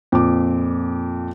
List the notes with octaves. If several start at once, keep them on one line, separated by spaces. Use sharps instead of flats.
F2 A#2 D6